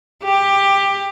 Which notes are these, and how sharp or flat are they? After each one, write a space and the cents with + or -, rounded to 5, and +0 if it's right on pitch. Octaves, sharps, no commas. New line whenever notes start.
G4 +15